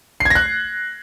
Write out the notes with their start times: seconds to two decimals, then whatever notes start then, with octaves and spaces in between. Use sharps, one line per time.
0.20 C7
0.25 G#6
0.30 A#6
0.35 F#6